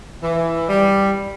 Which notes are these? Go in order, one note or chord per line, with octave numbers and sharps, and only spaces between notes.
E3
G3